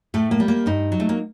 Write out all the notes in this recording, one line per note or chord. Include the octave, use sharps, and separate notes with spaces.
A2 A3
A#3
G3
A#3
G2 D#4
F#3
A3
A#3